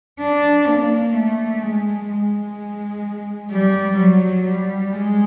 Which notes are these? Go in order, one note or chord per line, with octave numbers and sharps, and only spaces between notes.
D4
A#3
A3
G#3
G#3
G3
F#3
G3
G#3